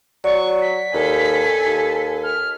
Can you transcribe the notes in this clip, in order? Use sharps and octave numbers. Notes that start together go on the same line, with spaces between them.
F#3 D5 C#6
B6
D#2 A4 G#5
D#2
F6